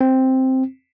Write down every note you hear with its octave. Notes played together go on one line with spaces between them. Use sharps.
C4